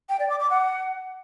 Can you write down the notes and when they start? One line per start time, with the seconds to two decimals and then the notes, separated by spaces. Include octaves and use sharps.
0.09 G5
0.20 D5
0.30 D6
0.40 D6
0.50 F#5